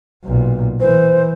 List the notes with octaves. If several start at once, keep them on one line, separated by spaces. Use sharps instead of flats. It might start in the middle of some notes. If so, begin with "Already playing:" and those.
B1 A#2
E3 C5